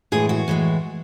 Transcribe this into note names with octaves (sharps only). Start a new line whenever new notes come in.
A2 E3 G#3 G#4
F#4
A2 E3 G#3